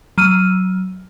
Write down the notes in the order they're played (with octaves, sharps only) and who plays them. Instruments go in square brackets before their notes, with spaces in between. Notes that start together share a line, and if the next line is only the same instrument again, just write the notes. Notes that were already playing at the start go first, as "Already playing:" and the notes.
[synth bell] F#3 F6 D#7